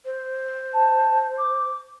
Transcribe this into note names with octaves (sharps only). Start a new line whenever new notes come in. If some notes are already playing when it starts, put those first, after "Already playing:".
C5
A5
D6